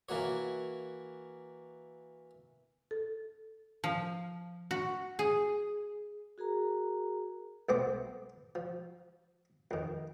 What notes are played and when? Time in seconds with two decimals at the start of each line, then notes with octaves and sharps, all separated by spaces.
0.09 E3 A#3 F#4 C#5
2.91 A4
3.84 F3
4.71 F#4
5.19 G#4
6.38 F#4 G#4 A#4 A#5
7.69 B1 A3 B3 C4 C5 D6
8.55 F3
9.71 F2 D#3